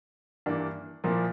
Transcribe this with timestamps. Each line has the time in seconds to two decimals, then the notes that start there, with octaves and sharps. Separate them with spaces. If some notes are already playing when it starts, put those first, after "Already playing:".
0.46 G2 E3 A#3 D4
1.04 A#2 F3 A#3 E4